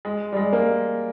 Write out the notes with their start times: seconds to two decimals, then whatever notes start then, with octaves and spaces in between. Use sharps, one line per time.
0.05 G#3
0.32 G3
0.37 G#3
0.53 A#3